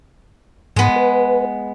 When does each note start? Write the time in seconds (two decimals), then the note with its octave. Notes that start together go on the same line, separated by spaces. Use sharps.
0.76 G#2 G#3 B3
0.96 B4